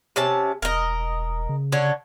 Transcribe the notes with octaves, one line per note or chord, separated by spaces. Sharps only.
C3 C#4 A5
E1 A#4 D#5
C#3
D3 C#5